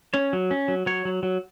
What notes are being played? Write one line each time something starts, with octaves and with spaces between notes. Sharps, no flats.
C#4 C#5
F#3
C#4
F#3
F#3 C#5
F#3
F#3